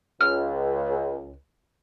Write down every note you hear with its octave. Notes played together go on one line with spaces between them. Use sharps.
C#2 F6